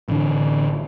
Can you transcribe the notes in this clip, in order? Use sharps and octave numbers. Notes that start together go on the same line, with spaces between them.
A1 D3